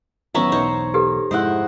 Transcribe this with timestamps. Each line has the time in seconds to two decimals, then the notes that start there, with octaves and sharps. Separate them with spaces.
0.35 A1 D#3 F#3 B3 C#4 E5 A#5 C#6
0.52 B1 E2 D#4 C5 C#5
0.94 G4 A4 B4
1.31 F1 G#2 G#3 E4 C5 D#5 F#5